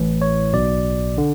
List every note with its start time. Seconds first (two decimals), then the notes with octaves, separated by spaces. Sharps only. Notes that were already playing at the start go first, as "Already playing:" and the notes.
Already playing: A1 A2 E3
0.22 C#5
0.53 B1 B2 D5
1.18 D3